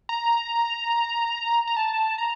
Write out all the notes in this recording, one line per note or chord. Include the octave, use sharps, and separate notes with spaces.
A#5
A#5
A5
A#5